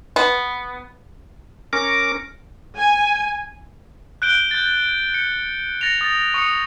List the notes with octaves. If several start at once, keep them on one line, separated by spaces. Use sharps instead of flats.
B3
C#4 A#4 D6
G#5
F#6 G6 D7 G7
G6 A6
C#7
A6 A#6 C#7 F7
D#6 A6
C#6 D#6 C#7